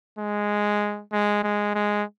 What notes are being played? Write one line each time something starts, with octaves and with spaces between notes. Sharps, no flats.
G#3
G#3
G#3
G#3